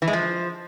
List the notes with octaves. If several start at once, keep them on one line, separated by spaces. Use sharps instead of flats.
E3
G#3
F3